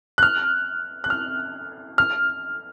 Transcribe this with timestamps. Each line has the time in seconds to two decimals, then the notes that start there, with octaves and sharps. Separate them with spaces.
0.18 F#6
0.23 F6
1.04 F#6
1.10 F6
1.98 F6